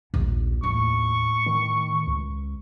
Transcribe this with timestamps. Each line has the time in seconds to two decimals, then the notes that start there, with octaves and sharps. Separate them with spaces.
0.14 A#1 D#2
0.63 A2 C#6
1.46 D#3
2.07 C#2